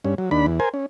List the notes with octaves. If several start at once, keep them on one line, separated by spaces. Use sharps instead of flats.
G2 C#4
F#3
D#2 D4 B5
E2
A#4 C5 G#5
C#4